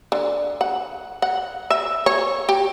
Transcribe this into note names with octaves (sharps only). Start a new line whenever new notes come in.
D3
F#5
F#5
E5
C#5
G4